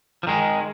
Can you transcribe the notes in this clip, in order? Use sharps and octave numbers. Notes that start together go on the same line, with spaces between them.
F3
D#3 G#3